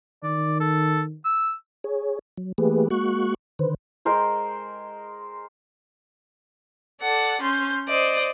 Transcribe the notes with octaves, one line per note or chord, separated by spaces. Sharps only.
D#3 D5
A4
E6
G#4 C#5
F#3
E3 A3 A#3 G4 G#4 B4
G#3 A#3 F#4 C#6 F#6
D3 D#3 B4 C5
G#3 A#4 C5 G5
A4 D5 F#5
C#4 C6 G6
C5 D5 D#5